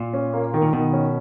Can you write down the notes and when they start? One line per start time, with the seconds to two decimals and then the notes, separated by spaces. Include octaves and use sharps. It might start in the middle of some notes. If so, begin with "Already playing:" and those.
Already playing: A#2
0.14 C#4
0.33 A#3
0.54 D#3
0.62 A#2
0.73 B2 D#3
0.93 C#4